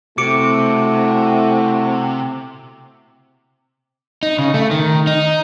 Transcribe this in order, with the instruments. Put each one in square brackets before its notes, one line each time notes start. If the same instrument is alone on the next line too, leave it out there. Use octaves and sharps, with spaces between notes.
[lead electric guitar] C3 [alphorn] A3 [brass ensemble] E4 F#4 [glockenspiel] D6 C#7 D7
[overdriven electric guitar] D#4
C#3
A3
D#3
D#4